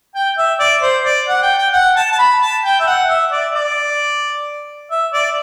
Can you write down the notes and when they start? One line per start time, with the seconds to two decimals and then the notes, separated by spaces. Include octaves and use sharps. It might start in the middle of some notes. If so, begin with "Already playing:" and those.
0.15 G5
0.38 E5
0.60 D5
0.82 C5
1.05 D5
1.29 F#5
1.42 G5
1.58 G5
1.73 F#5
1.96 A5
2.12 A5
2.19 B5
2.42 A5
2.64 G5
2.80 E5
2.87 F#5
3.09 E5
3.32 D5
3.55 D5
4.91 E5
5.13 D5